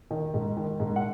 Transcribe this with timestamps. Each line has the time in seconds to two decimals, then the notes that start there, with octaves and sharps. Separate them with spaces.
0.11 D#3
0.34 G#2
0.57 D#3
0.80 G#2
0.96 F#5